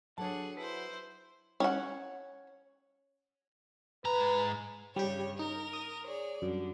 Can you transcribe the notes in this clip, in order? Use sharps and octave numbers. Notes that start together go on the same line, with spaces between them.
F#3 D4 G#4 A4 C#5 F#5 A5
E4 B4 C5
C#4 F#5
G#2 B4 A#5
G2 C#3 G3 G4 C#5
D#4 A#4
D#6
G#4 C#5 D5
F#2 D3 G3